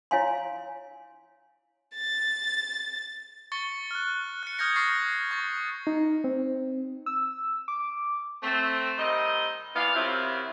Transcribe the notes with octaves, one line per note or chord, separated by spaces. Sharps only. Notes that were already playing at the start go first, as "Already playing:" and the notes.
E4 C#5 F5 G#5 C6
A6
C#6 A6 C#7 G7
F6 F#6
F#6 C#7
D#6 F6 G6 G#6 A#6 C#7
C#6 F6 A6 A#6 C7
C#6 A6
D#4
C4
E6
D6
A3 C4
D#3 G3 C4 D#5
E3 B3 D5 F5
F#2 C3 F#3 C4 E4 F4